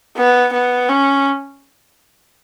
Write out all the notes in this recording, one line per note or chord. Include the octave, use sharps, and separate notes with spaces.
B3
B3
C#4